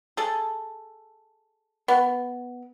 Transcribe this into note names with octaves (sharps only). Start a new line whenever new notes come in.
G#4 A4
B3